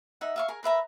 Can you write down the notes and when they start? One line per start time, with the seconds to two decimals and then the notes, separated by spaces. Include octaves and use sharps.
0.21 D#4 E5 F#5
0.36 E5 F5 C#6
0.48 G#4 A#4
0.63 A#4 B4 E5 A#5